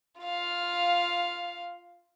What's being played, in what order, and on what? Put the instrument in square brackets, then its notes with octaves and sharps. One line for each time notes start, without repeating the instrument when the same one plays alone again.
[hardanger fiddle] F4 F5